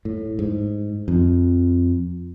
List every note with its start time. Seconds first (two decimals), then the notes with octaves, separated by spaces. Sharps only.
0.05 A2
0.39 G#2
1.08 F2